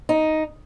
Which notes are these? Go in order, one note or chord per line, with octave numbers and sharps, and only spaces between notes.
D#4